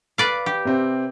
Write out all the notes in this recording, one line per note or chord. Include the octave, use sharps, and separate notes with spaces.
B4 D5 F5
G4
C3 C4